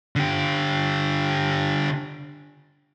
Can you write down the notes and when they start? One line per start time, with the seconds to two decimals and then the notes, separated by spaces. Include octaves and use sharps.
0.16 D3 G4